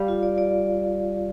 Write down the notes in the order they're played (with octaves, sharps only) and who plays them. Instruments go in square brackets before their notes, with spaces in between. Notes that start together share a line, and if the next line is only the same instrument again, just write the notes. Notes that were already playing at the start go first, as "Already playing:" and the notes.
Already playing: [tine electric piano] G3 [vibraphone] F5
[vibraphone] F4
D5
D5